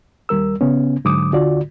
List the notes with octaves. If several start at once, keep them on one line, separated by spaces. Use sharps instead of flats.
D#2 G3 A#4 E6
C#3 B3 C#4
G#2 D3 F#3 D6 D#6
D2 D3 F4 F#4 D5